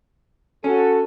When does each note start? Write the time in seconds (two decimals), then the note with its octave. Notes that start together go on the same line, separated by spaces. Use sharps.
0.64 C#4 F#4 A4